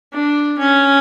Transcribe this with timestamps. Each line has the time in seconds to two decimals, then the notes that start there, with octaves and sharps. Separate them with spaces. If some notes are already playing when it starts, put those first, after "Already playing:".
0.13 D4
0.59 C#4